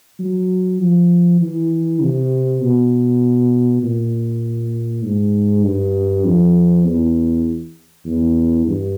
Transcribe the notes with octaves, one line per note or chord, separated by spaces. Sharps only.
F#3
F3
E3
C3
B2
A#2
G#2
G2
F2
E2
E2
G2